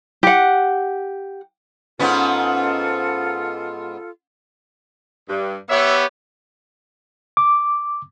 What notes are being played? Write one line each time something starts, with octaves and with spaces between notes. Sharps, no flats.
G4 F#5
G#2 B3 C#4 F4 A4
G2
B3 G4 C#5 E5
D6